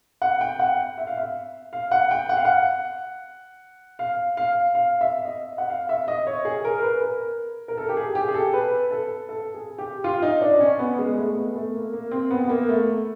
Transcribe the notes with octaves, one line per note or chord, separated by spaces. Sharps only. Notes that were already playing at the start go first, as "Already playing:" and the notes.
F#5
G5
F#5
E5
F5
E5
F5
F#5
G5
F#5
F5
F#5
F5
F5
F5
E5
D#5
F#5
F5
E5
D#5
C#5
G#4
A#4
B4
A#4
A#4
A4
G4
G#4
G4
G#4
A4
B4
A4
A4
G#4
G4
F4
D#4
D4
C#4
B3
G#3
A3
B3
A3
A#3
A#3
C4
B3
B3
A#3
A3